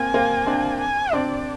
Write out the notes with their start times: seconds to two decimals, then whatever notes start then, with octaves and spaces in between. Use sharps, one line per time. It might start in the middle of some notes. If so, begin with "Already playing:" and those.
Already playing: A#3 C4 G#5
0.14 A#3 C4
0.47 C4 D4
0.80 G#5
1.13 C4 D4 D5